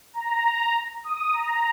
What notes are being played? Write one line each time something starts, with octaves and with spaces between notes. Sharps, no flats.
A#5
D#6
A#5